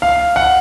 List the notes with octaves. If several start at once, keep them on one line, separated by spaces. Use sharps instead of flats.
F5
F#5